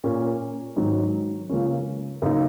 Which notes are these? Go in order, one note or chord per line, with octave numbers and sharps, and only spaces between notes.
A#2 A#3 C#4
G#2 D#3 F#3 D#4
C#2 C#3 A#3 C#4
F#2 C#3 A#3 D#4